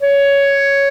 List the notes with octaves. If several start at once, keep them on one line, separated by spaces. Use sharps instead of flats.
C#5